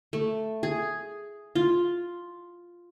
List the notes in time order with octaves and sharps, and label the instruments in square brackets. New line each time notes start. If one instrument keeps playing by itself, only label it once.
[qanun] A3
G#4
F4